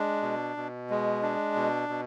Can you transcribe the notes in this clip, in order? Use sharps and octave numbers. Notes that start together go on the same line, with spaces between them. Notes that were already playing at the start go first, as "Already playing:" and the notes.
Already playing: G#3 D4
B2
B2
G#3
D4
B2
B2